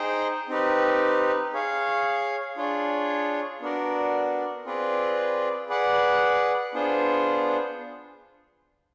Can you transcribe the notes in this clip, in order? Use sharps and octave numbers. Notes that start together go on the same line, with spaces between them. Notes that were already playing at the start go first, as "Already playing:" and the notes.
Already playing: D#4 G#4 C5 D#5 G5
C4 D#4 G4 B4
G#4 C#5 F5
D4 F4 G#4 C#5
B3 D4 F#4 A#4 D5
C4 F4 G#4 B4 D5
G#4 B4 D5 F#5
B3 D4 F4 G#4 C5